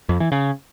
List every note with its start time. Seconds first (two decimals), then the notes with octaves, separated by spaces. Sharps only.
0.09 F2
0.20 E3
0.32 C#3